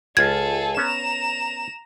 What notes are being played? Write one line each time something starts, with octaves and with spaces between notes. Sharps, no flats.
C#2 F4 G#4 A4 G#6
B3 C#4 A#5 E7